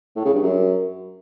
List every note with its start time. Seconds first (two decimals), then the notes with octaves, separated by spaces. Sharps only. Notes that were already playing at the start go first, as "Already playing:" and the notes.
0.16 A2
0.25 C#3
0.34 G2
0.43 F#2